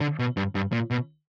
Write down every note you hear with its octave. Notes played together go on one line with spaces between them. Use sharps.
D3
B2
G2
G2
A#2
B2